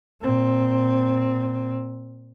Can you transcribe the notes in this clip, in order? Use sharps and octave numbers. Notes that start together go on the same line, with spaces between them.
A#2 C4